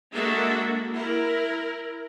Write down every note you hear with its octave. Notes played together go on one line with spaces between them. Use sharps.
G#3 A#3 D4 F#4 A4 E5
E4 A#4